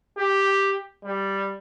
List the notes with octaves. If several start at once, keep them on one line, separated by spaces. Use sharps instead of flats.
G4
G3